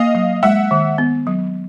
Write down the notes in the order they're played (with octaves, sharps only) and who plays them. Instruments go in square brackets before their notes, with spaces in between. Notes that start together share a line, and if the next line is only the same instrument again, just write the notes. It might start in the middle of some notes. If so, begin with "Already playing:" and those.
Already playing: [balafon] A#3 [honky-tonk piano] D#5 F5
[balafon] F#3
[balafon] G#3 [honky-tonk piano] E5 F#5
[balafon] D#3
B3
F#3